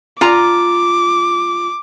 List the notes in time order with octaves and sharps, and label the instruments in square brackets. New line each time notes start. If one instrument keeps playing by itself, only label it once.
[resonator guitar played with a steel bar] F4 A#5 [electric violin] D6